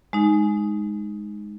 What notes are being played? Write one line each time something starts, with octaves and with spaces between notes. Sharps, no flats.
G#3 D#4